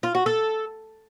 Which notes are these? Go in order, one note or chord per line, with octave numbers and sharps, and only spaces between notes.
F4
F#4
A4